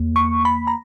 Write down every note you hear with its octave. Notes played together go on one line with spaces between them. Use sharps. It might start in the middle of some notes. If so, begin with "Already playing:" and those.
Already playing: E2 A#3
C#6
B5
A#5